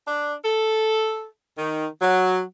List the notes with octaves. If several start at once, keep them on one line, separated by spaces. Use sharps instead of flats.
D4
A4
D#3
F#3